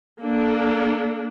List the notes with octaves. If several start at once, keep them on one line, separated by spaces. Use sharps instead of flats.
A#3 D4 A4